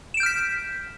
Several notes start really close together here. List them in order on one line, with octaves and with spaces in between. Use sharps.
E7 D7 G6 F6 B6